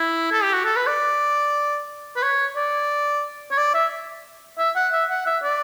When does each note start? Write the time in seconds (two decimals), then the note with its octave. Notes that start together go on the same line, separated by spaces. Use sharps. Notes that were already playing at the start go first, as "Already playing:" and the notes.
Already playing: E4
0.32 A4
0.43 G4
0.54 F#4
0.65 A4
0.76 B4
0.87 D5
2.16 B4
2.23 C#5
2.56 D5
3.51 C#5
3.58 D5
3.74 E5
4.59 E5
4.76 F#5
4.93 E5
5.10 F#5
5.27 E5
5.43 D5